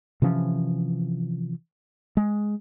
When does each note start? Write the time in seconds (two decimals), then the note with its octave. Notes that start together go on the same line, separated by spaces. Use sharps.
0.22 C3 E3 F3 C#4
2.17 G#3